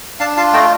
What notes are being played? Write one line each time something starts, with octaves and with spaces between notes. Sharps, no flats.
D4 F5 A5
F4 F5 A5
A3 D#5 G5